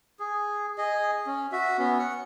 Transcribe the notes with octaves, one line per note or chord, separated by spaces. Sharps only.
G#4
G#4 D#5
C#4
F#4 E5
B3 C#4
F#5